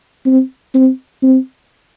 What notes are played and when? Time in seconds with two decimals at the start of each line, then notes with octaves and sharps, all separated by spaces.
0.26 C4
0.74 C4
1.23 C4